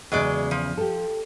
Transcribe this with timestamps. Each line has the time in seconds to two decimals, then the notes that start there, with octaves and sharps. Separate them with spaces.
0.12 E2 C#3 F#3 G#3 D5
0.51 F3
0.78 G4 A4